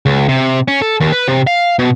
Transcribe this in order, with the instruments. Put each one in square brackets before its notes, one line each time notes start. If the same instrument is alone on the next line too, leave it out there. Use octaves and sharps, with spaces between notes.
[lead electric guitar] C#2
C3
C#4
A4
D#2
B4
C3
F5
B2